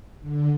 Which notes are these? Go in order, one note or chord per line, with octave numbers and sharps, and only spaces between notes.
D3